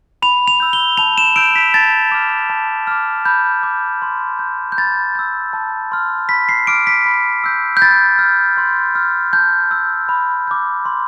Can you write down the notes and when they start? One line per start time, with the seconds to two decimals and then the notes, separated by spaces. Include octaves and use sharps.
0.22 B5 F7
0.48 F7
0.60 E6 G6
0.73 G7
0.97 A5 F7
1.18 E7
1.36 E6 G6 D7
1.56 B6
1.74 A5 A6
2.12 D6 F6
2.50 A5
2.87 D6 F6
3.25 B5 G6
3.63 D6 G6
4.02 C6
4.39 G6
4.72 G6
4.78 B5 A6
5.15 E6 G6
5.53 A5
5.92 C6 F6
6.29 B5 B6
6.49 C7
6.67 D6 F6 D7
6.87 B6
7.06 B5
7.44 E6 G6
7.77 G6
7.82 B5 A6
8.19 F6
8.57 C6
8.95 F6
9.33 A5 G6
9.71 E6 G6
10.09 B5
10.47 D6 G6
10.85 C6